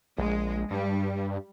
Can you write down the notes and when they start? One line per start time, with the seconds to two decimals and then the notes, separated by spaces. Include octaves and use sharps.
0.18 A#1 G#3
0.71 G2 G3